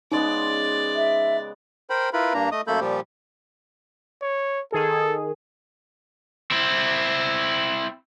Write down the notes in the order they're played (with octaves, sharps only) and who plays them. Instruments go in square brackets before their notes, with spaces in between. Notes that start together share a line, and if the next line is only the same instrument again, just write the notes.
[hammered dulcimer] C#3 G#3 B3 [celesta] D#4 [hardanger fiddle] D5
[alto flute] E5
[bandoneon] A#4 C5 G5 B5
E4 F4 A#4 B4 B5
G2 A#3 D4 A#5
A3 D#5 D#6
F#2 A3 A#3 A4 B5 G6
A#2 F3 G3 G4
[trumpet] C#5
[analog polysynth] D#3 G#4 [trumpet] A4
[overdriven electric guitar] C4 E4